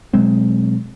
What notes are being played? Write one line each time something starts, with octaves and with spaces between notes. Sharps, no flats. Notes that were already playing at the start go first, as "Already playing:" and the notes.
B2 F#3 G#3 C4